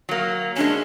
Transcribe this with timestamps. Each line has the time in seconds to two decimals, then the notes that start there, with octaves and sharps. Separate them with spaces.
0.09 F#3 A#3
0.56 G#3 C#4 D4